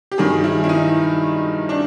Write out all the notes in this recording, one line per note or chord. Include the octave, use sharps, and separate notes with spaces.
G4
G2 D#3 F#3 G#4
E4
E4
D#4
D4